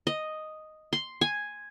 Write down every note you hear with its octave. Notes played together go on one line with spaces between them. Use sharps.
D#5
C6
G#5